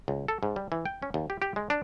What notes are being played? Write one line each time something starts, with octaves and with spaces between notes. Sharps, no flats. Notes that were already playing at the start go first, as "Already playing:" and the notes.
C#2
A4
G#2
G3
E3
G5
C#4
D#2
G4
G4
G#3
D4